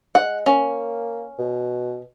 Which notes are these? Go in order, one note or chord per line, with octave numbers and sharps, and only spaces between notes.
G#3 F#5
A#3 C#4
B2